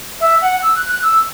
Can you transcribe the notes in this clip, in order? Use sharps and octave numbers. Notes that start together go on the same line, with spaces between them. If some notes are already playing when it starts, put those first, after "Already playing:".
E5
F#5
E6
F#6
F#6
E6